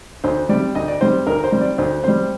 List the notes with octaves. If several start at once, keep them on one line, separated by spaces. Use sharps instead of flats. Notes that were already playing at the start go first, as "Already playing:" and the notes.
D2 C5
C3 G3 D5
D2 D#5
D5
C3 G3 C5
D2 A#4
C5
C3 G3
D5
D2 C5
C3 G3 C5